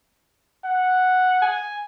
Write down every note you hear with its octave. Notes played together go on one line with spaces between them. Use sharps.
F#5
G#5